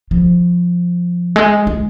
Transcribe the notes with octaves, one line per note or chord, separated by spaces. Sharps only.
F3
G#3
G#3